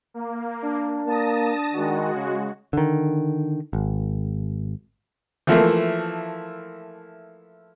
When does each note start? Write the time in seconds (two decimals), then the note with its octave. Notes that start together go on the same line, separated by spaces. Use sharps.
0.14 A#3
0.62 D4
1.07 A#3 A5 D#6 A#6
1.74 D#3 G#3 F#4
2.15 C#3
2.73 D3 D#3
3.73 G#1
5.47 E3 F3 A3 A#3